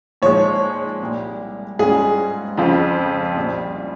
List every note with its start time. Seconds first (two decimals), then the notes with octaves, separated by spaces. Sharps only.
0.22 A#2 F3 G#3 D#4 C#5
1.00 C2 A#2 G3
1.79 G#2 G3 C#4 F4 G#4
2.57 F2 C#3 F3 C4 F4
3.37 C2 A#2 G3